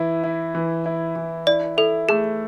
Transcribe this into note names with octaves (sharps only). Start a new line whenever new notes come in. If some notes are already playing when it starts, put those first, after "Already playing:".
Already playing: E3 E4
E4
E3
E4
E3
E4 D5
E4 A4
A3 G#4